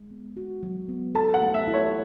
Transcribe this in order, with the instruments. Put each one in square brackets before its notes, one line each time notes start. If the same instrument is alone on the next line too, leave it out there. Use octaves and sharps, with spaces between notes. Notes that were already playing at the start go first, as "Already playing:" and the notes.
Already playing: [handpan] G#3
B3
F#4
F#3
B3
[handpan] A4 [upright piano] A5
[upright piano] F#5
[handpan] A3
[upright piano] E5
[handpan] E4
[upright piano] C#5